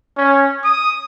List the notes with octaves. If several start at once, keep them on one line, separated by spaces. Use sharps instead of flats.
C#4
D#6